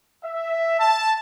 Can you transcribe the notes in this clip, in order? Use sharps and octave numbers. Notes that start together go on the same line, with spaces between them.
E5
A5